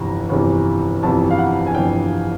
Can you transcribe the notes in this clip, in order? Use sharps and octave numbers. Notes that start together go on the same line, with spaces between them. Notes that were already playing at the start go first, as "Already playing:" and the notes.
Already playing: G1 F2 C3 E3 A#5
G1 F2 C3 E3
G1 F2 C3 E3 A5
F5
F#5
G#5
G1 F2 C3 E3 G5